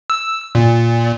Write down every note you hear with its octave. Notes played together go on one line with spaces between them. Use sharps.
E6
A#2